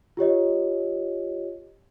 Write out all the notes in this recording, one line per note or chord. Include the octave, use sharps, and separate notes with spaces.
F4 G4 C#5 D#5